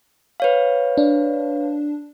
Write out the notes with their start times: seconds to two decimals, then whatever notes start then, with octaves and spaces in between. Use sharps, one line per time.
0.40 B4 C#5 F5
0.97 D4